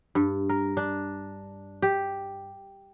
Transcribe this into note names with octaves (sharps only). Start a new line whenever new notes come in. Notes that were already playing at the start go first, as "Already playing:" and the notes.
G2
A#4
D4
G4